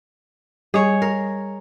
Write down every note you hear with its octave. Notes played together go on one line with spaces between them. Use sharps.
G3 G#4 C#5 D#5
A#4